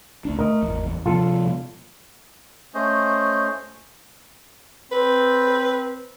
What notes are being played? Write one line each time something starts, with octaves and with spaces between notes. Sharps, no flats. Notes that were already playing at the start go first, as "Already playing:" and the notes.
D2 D4
A3 A#4 D#5
G#1 E2
C3 F3 B3 F4 A4
A3 C#4 C5 D#5
C4 B4